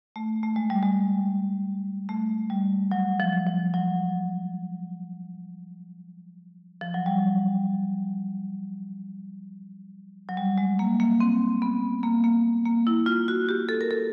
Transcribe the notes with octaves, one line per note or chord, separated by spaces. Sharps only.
A3
A3
G#3
G3
G#3
A3
G3
F#3
F3
F3
F#3
F3
F#3
G3
F#3
G3
G#3
A#3
A#3
C4
B3
A#3
A#3
A#3
E4
F4
F#4
G4
A4
A#4
A4